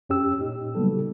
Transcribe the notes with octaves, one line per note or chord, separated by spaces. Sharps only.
F#2 C#4 G4 E6
A#2 D#4
C#3 F#3 G3 A#3 B3 A4